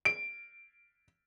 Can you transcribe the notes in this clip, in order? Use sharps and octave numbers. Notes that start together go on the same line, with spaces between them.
D7